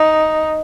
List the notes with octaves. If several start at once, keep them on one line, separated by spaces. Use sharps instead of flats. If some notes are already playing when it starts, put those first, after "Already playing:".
Already playing: D#4